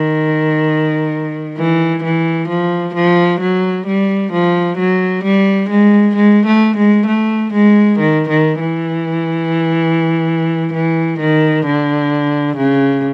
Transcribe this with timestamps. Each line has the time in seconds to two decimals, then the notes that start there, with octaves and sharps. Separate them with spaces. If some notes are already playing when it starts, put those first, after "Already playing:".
Already playing: D#3
1.57 E3
2.04 E3
2.49 F3
2.95 F3
3.41 F#3
3.87 G3
4.33 F3
4.78 F#3
5.24 G3
5.69 G#3
6.16 G#3
6.46 A3
6.77 G#3
7.07 A3
7.53 G#3
7.99 D#3
8.29 D#3
8.60 E3
10.74 E3
11.19 D#3
11.66 D3
12.57 C#3